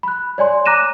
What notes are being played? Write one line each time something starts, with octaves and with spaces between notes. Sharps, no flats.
B5 F#6
C#5 D5 G#5 C6
A#5 D6 F#6 A#6 D#7 E7